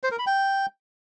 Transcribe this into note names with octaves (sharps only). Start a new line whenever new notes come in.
C5
A#4
B5
G5